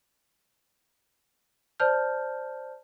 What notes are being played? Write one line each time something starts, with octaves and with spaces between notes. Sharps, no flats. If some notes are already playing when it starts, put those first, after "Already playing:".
C5 D5 A5 F6 G6